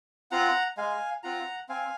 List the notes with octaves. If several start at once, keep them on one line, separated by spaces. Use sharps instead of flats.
C4 F4 F#5 A#5
G#3 F5 G#5
C4 F4 F#5 A#5
C4 F5 G#5